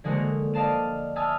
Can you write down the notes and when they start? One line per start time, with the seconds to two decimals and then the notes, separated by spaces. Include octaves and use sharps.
0.04 D3 F3 G#3 A#3 F#4 A#4
0.54 D5 D#5 F5 A5 E7
1.16 E5 G#5 A5 D#6 F6